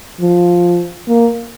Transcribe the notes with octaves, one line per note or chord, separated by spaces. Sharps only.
F3
A#3